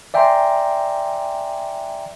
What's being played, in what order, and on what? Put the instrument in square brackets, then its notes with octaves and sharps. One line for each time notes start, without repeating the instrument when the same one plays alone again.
[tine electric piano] D5 E5 G5 G#5 A#5 C6